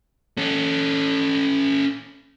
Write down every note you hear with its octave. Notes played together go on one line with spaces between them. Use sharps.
C#4 A4